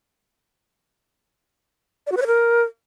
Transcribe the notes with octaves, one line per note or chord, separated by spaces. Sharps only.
D5
F#4
B4
C#5
A#4